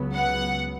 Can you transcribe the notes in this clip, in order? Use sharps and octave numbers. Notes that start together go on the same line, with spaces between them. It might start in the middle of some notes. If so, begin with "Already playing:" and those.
Already playing: C#2 C#3 F#3 B3
F#5